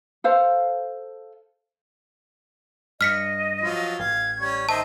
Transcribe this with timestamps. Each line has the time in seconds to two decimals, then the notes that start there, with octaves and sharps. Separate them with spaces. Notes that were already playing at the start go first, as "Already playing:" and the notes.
0.24 A4 C5 F5
3.01 G2 D#5 F6 B6 C#7
3.61 F3 F#3 F4
3.99 A1 F5 G#6
4.40 G3 C#4 C#6
4.69 D#3 C5 D#5 E5 A5